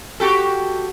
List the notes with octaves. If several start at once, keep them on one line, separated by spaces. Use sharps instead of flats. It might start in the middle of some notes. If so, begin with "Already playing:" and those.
F#4 G4 A4